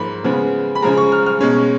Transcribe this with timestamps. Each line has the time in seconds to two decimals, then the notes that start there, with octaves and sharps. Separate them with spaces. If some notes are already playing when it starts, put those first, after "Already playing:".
Already playing: G#2 F3 A#3 B5
0.24 C#3 F3 G#3 B3
0.75 B5
0.82 C#3 F3 G#3 A#5
0.97 C#6
1.12 F6
1.26 F6
1.40 B2 G#3 C#4